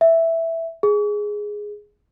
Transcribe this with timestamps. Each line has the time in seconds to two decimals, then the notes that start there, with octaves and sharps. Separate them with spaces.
0.01 E5
0.83 G#4